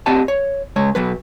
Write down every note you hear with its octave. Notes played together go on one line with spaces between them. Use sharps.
C4 G4 D5 D#5 F#5 A5
C#5
C#3 G#3 C#5
B2 F#3 B4